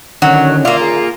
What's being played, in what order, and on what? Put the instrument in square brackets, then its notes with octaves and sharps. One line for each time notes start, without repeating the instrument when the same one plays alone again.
[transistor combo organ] D3 D#3 C#4 [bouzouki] F#3
[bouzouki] A#3 F4 [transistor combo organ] D5 E5 F5
[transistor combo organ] G#4